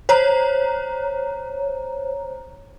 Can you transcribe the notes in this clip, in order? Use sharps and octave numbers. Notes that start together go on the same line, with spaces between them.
C5 C#5 A#5